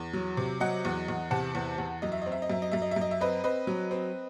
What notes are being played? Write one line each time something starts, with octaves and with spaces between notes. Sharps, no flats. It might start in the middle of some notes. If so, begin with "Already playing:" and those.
Already playing: E2
F#3
C3
F#3 D#5 F#5
E2
E2
C3 F#5 A5
E2
E2
F#2 D#5
E5
C4 D#5
E5
D#5
F#2 E5
D#5
F#2 E5
D#5
E5
F#2 D#5
E5
C4 B4 D#5
C4 B4 D#5
F#3
C4